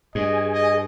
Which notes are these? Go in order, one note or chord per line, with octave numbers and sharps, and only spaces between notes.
G2 G#4 D#5 G#5
D#5